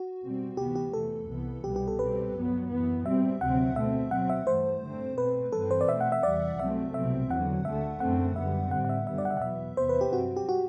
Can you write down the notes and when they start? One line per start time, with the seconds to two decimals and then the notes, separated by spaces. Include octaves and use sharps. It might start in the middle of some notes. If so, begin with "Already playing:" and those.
Already playing: F#4
0.23 B2 G3 C4
0.57 D2 C3 E3 B3 G4
0.75 G4
0.93 E2 C3 E3 A3 A4
1.29 C2 C3 E3 B3
1.64 C2 B2 G3 B3 G4
1.76 G4
1.88 A4
1.99 B2 G3 C4 B4
2.34 G2 F#3 B3
2.70 F#2 E3 B3
3.06 B2 G3 C4 E5
3.40 D2 C3 F#3 C4 F#5
3.76 B2 A3 C4 E5
4.11 B2 F#3 C4 F#5
4.30 E5
4.47 G2 E3 A3 C5
4.82 G2 D3 A3 C4
5.17 B2 A3 C4 B4
5.53 G2 E3 G3 C4 A4
5.71 C5
5.81 D5
5.89 B2 A3 C4 E5
6.00 F#5
6.12 E5
6.23 E2 C3 E3 G3 D5
6.59 C2 C3 F#3 A3 C4 E5
6.94 C2 B2 F#3 C4 E5
7.30 E2 D3 F#3 F#5
7.65 D2 D3 A3 E5
8.00 F#2 D3 A3 C4 F#5
8.36 F#2 D3 G3 B3 E5
8.71 A2 G3 C4 F#5
8.85 F#5
8.89 E5
9.07 F#2 D3 G3 B3 E5
9.18 D5
9.25 F#5
9.30 E5
9.37 F#5
9.42 E2 B2 F#3 B3 E5
9.77 E2 C3 E3 B3 C5
9.89 B4
10.01 G4
10.13 G2 F#3 C4 F#4
10.37 G4
10.49 F#4